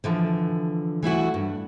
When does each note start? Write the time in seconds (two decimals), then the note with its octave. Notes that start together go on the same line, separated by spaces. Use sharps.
0.04 D3 E3 F3
1.03 E3 A3 E4 F#4
1.34 G2